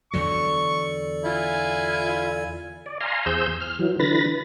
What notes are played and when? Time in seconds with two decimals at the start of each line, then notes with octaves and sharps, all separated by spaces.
0.13 E2 D3 F#3 A4 D5 C#6
1.24 E4 F4 G#5
2.86 D5
3.01 F5 G#5 A#5 C6
3.26 E2 G#4 C5 E6 G6
3.60 F6
3.79 E3 F#3
4.00 D3 E3 B4 B5 A6 A#6